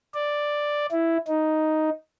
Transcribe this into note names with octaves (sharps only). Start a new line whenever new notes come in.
D5
E4
D#4